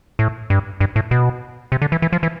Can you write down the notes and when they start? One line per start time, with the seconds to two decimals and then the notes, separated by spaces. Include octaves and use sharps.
0.19 A2
0.50 G2
0.80 G2
0.96 A2
1.11 B2
1.72 C3
1.82 D3
1.92 E3
2.02 E3
2.13 F3
2.23 E3